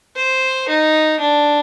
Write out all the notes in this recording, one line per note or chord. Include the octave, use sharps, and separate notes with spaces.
C5
D#4
D4